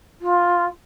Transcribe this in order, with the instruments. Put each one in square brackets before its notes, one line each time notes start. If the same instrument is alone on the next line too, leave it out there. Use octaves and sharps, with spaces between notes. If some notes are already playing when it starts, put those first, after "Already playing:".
[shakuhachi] F4